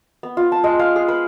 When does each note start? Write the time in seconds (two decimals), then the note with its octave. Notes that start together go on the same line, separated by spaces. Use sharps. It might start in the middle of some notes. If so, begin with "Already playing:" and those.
0.23 B3
0.37 F4
0.52 A5
0.64 G#3
0.79 F5
0.96 G#4
1.08 B4